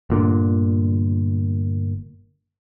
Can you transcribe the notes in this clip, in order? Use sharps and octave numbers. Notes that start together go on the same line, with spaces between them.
G1 A#2 D3